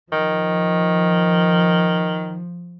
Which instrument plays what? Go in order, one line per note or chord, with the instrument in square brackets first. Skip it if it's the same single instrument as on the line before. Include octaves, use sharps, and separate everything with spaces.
[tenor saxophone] D#3 [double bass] F3